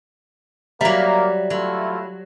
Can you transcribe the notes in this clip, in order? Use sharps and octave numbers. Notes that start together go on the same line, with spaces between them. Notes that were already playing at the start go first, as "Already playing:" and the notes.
F#3 G3 A#3 E5 A#5
F#3 A3 E4 F4